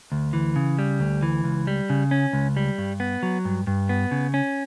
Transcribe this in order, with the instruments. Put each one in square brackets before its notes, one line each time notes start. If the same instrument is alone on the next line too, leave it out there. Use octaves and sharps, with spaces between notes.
[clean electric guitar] D2
E3
C#3
G3
D2
E3
C#2
G3
C#3
C#4
C#2
G3
G2
B3
F#3
G2
G2
B3
C#3
C#4